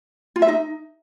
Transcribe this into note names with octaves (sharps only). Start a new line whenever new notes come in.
F4
E5
D#4